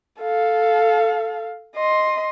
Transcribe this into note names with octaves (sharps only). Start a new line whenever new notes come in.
A4 F5
D#5 C6